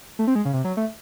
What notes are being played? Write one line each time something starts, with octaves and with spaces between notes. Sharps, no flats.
A3
C4
G#3
C#3
C3
F#3
A3